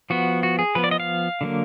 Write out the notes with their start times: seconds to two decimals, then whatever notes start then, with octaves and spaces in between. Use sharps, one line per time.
0.10 F3 B3 F#4
0.43 F#4
0.59 G#4
0.75 F3 B3 B4
0.84 D5
0.91 D#5
1.00 F5
1.41 D3 F#3 A#3